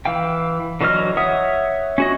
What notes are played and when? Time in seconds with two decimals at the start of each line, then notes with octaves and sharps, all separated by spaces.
0.05 E3 F5 G5
0.81 D3 E3 F#3 D#5 F6
1.17 C#5 E5 F#5 D#6
1.98 C#4 F#4 D#5